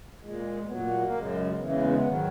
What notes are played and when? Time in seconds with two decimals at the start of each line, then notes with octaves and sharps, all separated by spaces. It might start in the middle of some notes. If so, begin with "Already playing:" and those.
0.21 A#2 G#3
0.67 A#2 F#3 B3
0.79 A#3
0.90 G#3
1.02 A#3
1.12 F#2 C#3 G#3
1.58 E2 C#3 E3 G#3 B3
1.69 C#4
1.81 A#3
1.92 B3
2.04 G#2 D#3 F#3